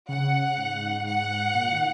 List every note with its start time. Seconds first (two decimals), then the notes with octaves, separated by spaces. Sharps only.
0.09 C#3 F#5
0.57 G#2
1.07 F#5
1.55 A#2
1.71 D#3